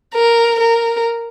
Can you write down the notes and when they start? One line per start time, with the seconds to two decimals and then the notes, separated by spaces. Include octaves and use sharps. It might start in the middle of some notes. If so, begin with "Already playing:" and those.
0.14 A#4
0.60 A#4